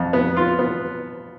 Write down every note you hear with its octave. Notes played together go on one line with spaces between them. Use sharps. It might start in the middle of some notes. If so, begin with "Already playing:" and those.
Already playing: F2
B3
F4
B3